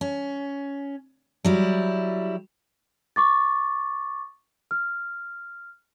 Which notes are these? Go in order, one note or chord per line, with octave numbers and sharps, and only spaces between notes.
C#4
F#3 G3 E4
C#6 D6 A6
F6